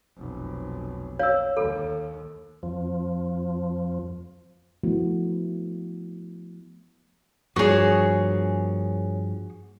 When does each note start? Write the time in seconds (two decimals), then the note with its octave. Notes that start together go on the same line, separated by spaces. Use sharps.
0.17 F1 B1
1.19 C#5 F5 E6
1.57 D#2 A4
2.63 F2 F3
4.83 F3 A3 B3 E4 F#4
7.56 G2 F3 A#3 F#4 G#4 C#5